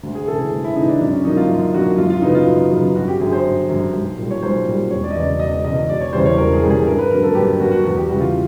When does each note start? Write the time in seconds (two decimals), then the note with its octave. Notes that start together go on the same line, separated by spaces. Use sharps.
0.03 D2
0.15 G#4
0.27 C#3 E3 A4
0.39 G#4
0.51 D2
0.64 E4
0.76 C#3 D#4
0.80 E3
0.88 D4
1.00 F#2 D4
1.13 C#4
1.25 D3 F#3 A#3 D#4
1.37 F4
1.49 F#2
1.74 D3 F#3 A#3 F#4
1.98 F#2 F4
2.10 F4
2.22 C#3 F#3 B3 D#4
2.35 F4
2.46 F#2
2.71 C#3 F#3 B3
2.96 G1 F#4
3.08 G4
3.21 F#2 D3 G#4
3.33 C5
3.45 G1
3.69 F#2 D3
3.93 B1
4.18 A#2 G3
4.31 C#5
4.43 B1 C5
4.66 A#2 G3
4.91 E1 C#5
5.04 D5
5.10 D#5
5.15 E2 C#3 D5
5.39 E1 D#5
5.52 D#5
5.64 E2 C#3 D#5
5.77 D#5
5.89 E1 D5
6.01 C#5
6.13 E2 C#3 E3 G3 C5
6.26 C#5
6.38 E1 A#4
6.53 G#4
6.62 E2 C#3 E3 G3
6.70 G#4
6.86 G2 A#4
6.99 B4
7.11 D3 F#3 A#3 A#4
7.23 A4
7.35 G2 G4
7.60 D3 F#3 A#3 F#4
7.71 F#4
7.84 E2 F#4
7.97 G4
8.08 C#3 E3 G3 F#4
8.20 F4